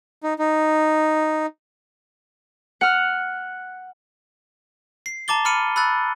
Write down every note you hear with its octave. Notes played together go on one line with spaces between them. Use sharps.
D#4
D#4
F#5 F6
C7
A5 A#5 D6 A6 G7
B5 F6 C#7 D#7
B5 E6 F#6 A6